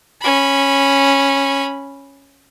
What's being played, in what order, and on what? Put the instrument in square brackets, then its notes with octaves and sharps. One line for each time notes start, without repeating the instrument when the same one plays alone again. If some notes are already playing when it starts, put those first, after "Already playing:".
[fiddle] C#4 B5